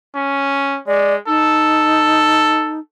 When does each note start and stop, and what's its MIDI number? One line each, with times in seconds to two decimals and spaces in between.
0.15 0.79 61
0.87 1.17 56
0.87 1.14 74
1.27 2.80 63
1.27 2.80 69